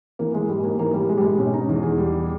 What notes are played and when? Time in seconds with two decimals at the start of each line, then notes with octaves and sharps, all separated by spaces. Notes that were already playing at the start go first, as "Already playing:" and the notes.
0.19 E3 A#3
0.34 G#3
0.49 G#2 G3
0.64 A#3
0.79 E3 A#3
0.94 G3
1.09 G#2 G#3
1.17 G3
1.24 G#3
1.38 B2 C#4
1.53 D#4
1.69 E2
1.83 G#4
1.98 G3